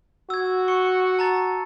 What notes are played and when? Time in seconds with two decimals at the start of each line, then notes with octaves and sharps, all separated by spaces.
0.30 F#4 E6 G#6
0.68 C#6 C#7
1.19 A5 A#5 A6